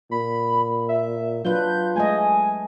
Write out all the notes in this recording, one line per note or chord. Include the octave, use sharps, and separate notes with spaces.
A#2 B5
E5
F#3 D4 F4 B4 G6
G#3 A3 D#5 G#5